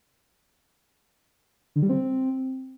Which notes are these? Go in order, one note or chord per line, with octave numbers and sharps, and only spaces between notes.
D3
G3
C4